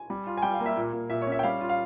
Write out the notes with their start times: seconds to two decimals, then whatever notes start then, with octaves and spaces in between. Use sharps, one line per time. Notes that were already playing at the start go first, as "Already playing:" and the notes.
Already playing: G#5
0.10 G3
0.27 F4
0.37 G#5
0.42 G3 G5
0.54 F5
0.60 A#3
0.66 E5
0.77 A#2
0.93 A#2
1.10 A#2 E5
1.22 C#5
1.27 C#4
1.32 E5
1.39 G5
1.43 G3 F5
1.61 F4
1.69 F5